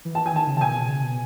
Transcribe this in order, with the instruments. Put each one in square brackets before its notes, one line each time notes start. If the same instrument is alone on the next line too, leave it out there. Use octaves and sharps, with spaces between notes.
[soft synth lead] E3
[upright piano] A5
G#5
[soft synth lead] D#3 [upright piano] A5
[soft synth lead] C#3
[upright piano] A5
[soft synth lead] B2 [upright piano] G#5
[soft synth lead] B2
C#3
B2